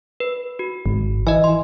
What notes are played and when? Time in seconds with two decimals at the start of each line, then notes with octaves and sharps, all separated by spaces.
0.20 B4
0.59 F#4
0.86 G#1
1.27 E3 D#5 G#5
1.44 C6